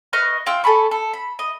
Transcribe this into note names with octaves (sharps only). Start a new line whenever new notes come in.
B4 D#5 C#6 F6
F4 G5 E6
A4 G#5 B5 C#6
A4
B5
D#5